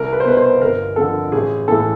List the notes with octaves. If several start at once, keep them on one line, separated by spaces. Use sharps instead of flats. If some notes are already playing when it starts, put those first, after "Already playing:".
Already playing: C2 A#4
B4
C5
B2 B4
C5
G1 A#4
F2 D3 A4
A1 G#4
A2 E3 A4